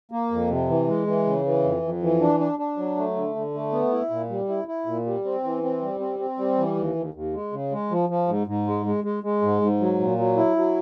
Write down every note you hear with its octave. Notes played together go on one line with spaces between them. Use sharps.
A#3
F2
C3
E3
G#3
E3
C#3
E3
F2
F2
E3
D4
D4
D4
F#3
A3
D3
D3
A3
B3
E4
A#2
G3
E4
E4
A#2
G3
C4
E3
C4
G3
C4
C4
G3
E3
D#2
D#2
D#2
G#3
C#3
G#3
F3
F3
G#2
G#2
G#3
G#3
G#3
G#3
G#2
G#2
F#3
A#2
F#3
E4
F#3